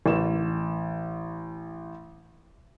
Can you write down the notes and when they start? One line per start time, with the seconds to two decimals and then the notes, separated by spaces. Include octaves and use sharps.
0.06 A1 E7